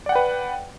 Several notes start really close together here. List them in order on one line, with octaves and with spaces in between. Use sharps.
D5 F#5 G5 B4